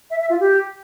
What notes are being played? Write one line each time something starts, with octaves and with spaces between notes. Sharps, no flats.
E5
E5
F4
G4